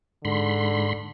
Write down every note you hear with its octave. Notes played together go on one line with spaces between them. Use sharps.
G#2 D3 B5 C6